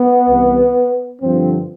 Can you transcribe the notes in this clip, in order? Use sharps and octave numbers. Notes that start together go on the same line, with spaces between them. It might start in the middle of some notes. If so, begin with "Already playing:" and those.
Already playing: B3
C2 C3 E3
G2 D3 F3 C4